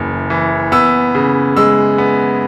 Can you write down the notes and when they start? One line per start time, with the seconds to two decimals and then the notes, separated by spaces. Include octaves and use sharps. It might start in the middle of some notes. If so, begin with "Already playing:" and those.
Already playing: F#1 C#3 E3
0.30 E3
0.72 B3 E6
1.15 C#3
1.57 G#3 E6
1.98 B3